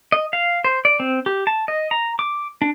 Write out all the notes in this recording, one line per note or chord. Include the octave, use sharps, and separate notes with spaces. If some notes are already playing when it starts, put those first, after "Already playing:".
D#5
F5
C5
D5
C4
G4
A5
D#5
A#5
D6
D4